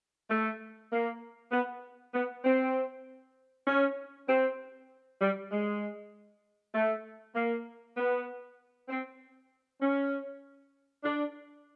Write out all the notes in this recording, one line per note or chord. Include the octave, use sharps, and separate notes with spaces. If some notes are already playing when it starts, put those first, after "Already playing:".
A3
A#3
B3
B3
C4
C#4
C4
G3
G#3
A3
A#3
B3
C4
C#4
D4